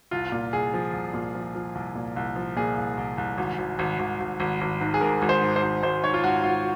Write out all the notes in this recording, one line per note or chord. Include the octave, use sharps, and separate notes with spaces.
C2 F4
A#2
C2 G#4
F3
C2
A#2
F3
F3
C2
A#2
C2
F3
A#2 G#4
C2
C2
C2
G#1
G#1
G#1
G#1
G#1
G#1
G#1
G#2
G#4
G#2 A#4
G#1
C5
G#2
C5
G#1
G#1 C5
G#2 C#5
F4
G#2 F#4
G#1 F4